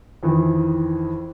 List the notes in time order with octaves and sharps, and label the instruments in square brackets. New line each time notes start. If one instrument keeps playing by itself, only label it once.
[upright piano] F2 D#3 E3